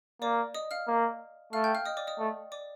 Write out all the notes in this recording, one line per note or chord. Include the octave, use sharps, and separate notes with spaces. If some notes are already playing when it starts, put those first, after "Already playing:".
A#3 D5 D6
D#5 D#6
F5 F6
A#3
A3 F5 F6
G5 G6
F5 F6
D#5 D#6
D5 D6
D#5 D#6
A3
D5 D6